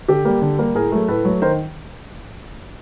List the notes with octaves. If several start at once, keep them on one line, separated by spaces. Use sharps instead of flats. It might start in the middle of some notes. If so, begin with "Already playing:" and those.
D3 G4 A4
G3 A#3
D3
G3 A#3
A2 G#4 A#4
F#3 A3
A2 A4 B4
F#3 A3
D#3 A#4 C5